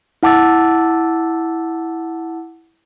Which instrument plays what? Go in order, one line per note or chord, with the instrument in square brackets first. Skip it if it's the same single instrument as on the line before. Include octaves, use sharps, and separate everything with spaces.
[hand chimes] E4 F#5 A5 D6 E6 A6